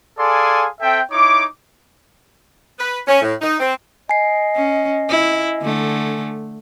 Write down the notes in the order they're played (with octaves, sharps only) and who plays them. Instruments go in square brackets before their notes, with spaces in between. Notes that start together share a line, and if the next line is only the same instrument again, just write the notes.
[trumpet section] G#4 A4 D5 F5 G#5 C6
C4 A4 E5 G5
D#4 E4 C#5 D6
[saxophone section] B4
C#4
A2
D#4
C4
[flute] D#5 [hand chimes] G#5 C7
[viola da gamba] C#4
E4
D3 A3